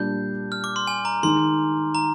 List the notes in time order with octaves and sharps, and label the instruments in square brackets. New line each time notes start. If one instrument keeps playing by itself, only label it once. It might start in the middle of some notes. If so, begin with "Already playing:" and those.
Already playing: [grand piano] A#2 G3 D4 [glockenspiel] G6
[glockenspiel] F6
D6
C6
G#5
A#5
[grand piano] D#3 G#3 D#4 [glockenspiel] C6
[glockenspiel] A#5